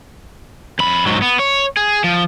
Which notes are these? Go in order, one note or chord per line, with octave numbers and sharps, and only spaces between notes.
F2 B5
G#2 F#3
B3
C#5
G#4
F3